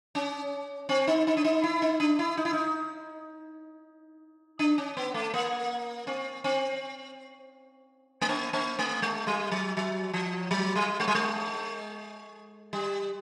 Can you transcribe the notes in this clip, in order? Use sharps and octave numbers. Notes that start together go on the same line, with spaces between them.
C#4
C4
D#4
D#4
D4
D#4
E4
D#4
D4
E4
D#4
E4
D#4
D4
C#4
B3
A3
A#3
C4
C4
A3
A#3
A#3
A3
G#3
G3
F#3
F#3
F3
F#3
G3
G#3
G3
G#3
G3